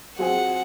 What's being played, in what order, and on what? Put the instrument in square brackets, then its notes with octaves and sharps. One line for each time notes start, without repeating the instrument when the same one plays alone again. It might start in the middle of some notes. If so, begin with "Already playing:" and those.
[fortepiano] F#3 C4 F4 G#4 [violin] F#5